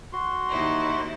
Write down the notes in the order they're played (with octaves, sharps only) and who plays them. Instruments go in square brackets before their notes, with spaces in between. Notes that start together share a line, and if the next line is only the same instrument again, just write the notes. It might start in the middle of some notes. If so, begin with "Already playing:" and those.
[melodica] F#4 C6
[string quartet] D#2 D#4 E4